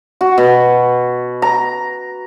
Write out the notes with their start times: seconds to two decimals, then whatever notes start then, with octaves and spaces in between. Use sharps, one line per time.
0.21 F#4
0.38 B2
1.42 A#5